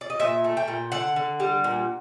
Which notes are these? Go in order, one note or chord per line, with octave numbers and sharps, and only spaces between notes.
D5
D#5
A#2 E5
A3
G5
A#2
D3 F#5
D3
G3
A#2